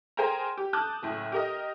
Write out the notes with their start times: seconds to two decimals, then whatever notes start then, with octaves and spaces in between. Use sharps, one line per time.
0.17 G#4 A#4 C5 G5 G#5 A#5
0.57 G4
0.73 A5 D6 D#6 F#6 G6
1.03 F#1 A2
1.32 G4 A#4 D#5